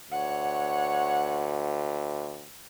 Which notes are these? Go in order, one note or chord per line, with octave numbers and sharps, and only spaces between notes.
D2 C#5 F#5